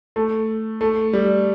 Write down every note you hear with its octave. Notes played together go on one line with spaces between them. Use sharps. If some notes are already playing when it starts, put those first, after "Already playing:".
A3
A3
G3